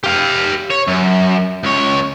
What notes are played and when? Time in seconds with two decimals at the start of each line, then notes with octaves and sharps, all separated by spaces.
0.04 G4 F5
0.70 C#5
0.87 F#2
1.64 C#2 C#5